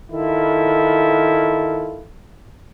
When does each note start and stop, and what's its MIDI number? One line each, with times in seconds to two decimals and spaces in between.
0.12 2.06 51
0.12 2.06 64
0.12 2.06 65
0.12 2.06 69